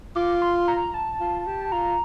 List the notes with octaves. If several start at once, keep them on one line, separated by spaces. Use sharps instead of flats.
F4 D6
C6
A#5
A5
F4
G4
F4 A#5